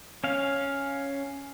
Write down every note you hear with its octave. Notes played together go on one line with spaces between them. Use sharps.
C#4 F5